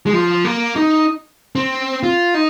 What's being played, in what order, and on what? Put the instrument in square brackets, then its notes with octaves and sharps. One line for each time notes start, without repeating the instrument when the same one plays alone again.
[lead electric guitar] G#3
F3
A#3
D#4
C4
F4
D#4